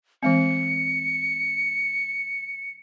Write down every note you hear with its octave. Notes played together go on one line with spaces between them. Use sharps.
E3 G#3 C4 C#7